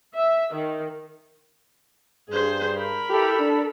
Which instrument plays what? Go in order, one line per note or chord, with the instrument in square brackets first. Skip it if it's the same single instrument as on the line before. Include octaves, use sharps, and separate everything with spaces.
[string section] E5
D#3
[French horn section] G2 [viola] G#4 C5
[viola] A#4 B5
[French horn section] E4 G4 [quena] A4
[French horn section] D4